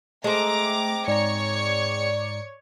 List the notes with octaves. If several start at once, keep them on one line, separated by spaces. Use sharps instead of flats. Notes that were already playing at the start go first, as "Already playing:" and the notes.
G#3 A3 C4 A#5 D6
G#2 C#5 D5 A#5 C#7